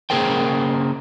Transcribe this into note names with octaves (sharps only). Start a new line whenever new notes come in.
C#3 A#3 G#4 A#4 C5 G5